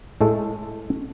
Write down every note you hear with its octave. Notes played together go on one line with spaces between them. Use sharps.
A2 G#3 A3 A4